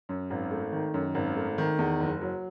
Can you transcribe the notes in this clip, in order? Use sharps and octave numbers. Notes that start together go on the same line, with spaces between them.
F#2
G#1
A3
D#3
F#2
G#1
A3
D#3
E2
F#1
F#3